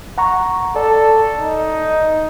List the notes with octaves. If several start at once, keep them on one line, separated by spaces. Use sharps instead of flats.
F#5 A#5 C#6
A4 D5
D#4